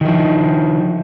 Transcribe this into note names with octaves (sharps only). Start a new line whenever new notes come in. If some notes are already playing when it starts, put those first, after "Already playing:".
D#3 F3